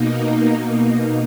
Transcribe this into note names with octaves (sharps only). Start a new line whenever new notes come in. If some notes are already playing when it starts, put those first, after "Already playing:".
Already playing: B2 A#3 D#4